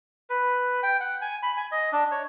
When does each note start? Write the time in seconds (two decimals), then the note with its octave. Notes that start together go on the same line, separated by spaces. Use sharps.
0.30 B4
0.83 G5
1.00 F#5
1.22 G#5
1.43 B5
1.57 G#5
1.72 D#5
1.92 D4
2.11 C#5